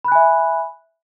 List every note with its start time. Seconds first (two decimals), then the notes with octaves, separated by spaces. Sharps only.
0.04 B5
0.08 F#6
0.12 G#5
0.15 E5